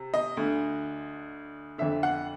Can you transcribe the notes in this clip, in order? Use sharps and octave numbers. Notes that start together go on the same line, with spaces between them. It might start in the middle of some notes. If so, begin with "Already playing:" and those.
Already playing: C3
D#5
D2 D3
F2 D3 E5
F#5